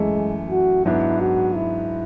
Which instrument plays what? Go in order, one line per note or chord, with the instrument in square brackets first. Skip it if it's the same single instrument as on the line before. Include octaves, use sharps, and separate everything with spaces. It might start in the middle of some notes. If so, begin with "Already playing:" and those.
Already playing: [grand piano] F#2 E3 A3 [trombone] G#3
[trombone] F#4
[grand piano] G#2 F#3 B3 D4 [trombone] E4
[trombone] F#4
E4